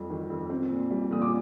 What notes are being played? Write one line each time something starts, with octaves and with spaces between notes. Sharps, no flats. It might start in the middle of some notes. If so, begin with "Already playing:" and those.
Already playing: F2 G3 C4
D#3
F2
C4
A#2
G3
A#2 D#6
D6